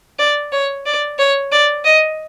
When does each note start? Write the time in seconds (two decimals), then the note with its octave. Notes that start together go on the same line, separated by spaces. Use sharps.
0.19 D5
0.52 C#5
0.86 D5
1.18 C#5
1.51 D5
1.84 D#5